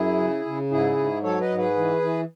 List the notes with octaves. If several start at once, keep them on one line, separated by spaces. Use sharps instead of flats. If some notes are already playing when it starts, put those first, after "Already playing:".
Already playing: F#2 E4 G#4
C#3
C#3
G#2 E4 G#4
G#2
F#3 A4 C#5
B4 D#5
G#2
G#4 B4
E3
E3